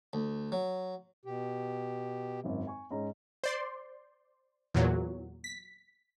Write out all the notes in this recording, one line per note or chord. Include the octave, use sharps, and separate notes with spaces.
D2
F#3
B2 G4
G#1 F#2
G#5 C#6
G#2 C#4 A#5
C5 D5 C6
E2 A#2 F#3
B6